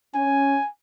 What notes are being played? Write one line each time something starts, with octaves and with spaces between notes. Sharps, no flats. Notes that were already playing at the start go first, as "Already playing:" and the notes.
C#4 G#5